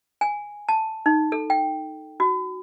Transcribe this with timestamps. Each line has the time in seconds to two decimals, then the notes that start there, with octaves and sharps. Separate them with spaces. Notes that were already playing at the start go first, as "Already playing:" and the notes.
0.21 G#5
0.69 A5
1.06 D#4
1.32 A4
1.50 G5
2.20 F#4